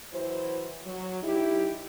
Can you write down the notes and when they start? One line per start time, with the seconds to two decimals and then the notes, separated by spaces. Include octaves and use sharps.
0.13 E3 F#3 E4 C5
0.85 F#3
1.23 D#4 E4 G4